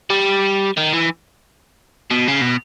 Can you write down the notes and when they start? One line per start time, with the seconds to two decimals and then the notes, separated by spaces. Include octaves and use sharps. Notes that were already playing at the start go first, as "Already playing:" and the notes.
0.10 G3
0.77 D#3
0.93 E3
2.10 B2
2.28 C#3
2.41 B2